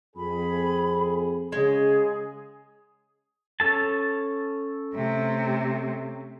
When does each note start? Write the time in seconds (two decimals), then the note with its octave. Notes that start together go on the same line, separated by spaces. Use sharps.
0.16 F2 G#4 B5
1.52 C#3 G#3 G#4
3.60 C#4 A4 A5
4.94 C3 A3